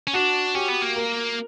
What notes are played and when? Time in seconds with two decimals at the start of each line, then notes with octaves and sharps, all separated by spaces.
0.07 C#4
0.13 D4 F#4
0.55 C#4 G4
0.69 B3
0.82 A#3
0.96 A#4